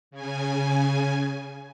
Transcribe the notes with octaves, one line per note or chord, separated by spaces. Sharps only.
C#3 G#5